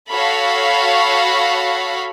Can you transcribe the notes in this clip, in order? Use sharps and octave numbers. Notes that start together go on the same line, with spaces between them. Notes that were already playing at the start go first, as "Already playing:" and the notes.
F#4 A4 C#5 F5 B5